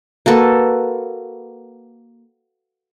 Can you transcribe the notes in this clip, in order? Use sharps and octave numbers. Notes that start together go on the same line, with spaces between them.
A#3 F#4 A4 B4